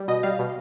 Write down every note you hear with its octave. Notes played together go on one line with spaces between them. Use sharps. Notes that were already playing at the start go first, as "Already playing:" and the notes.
Already playing: G3
B2 D#5
G3 F5
B2